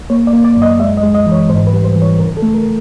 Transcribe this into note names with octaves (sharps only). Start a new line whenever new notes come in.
A#3 C#5
D5
A#3
D5
F#2 D#5
G#3 E5
D#5
G#3
D#5
E3
C#5
G#2 C5
B4
G3
C5
E3
C#5
C#3 A#4
A4
A3
A#4